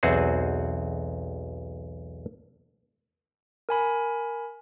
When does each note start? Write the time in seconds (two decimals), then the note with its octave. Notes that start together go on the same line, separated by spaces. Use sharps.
0.03 B1 E2 C4 F#4 G#4
3.69 A#4 G#5 B5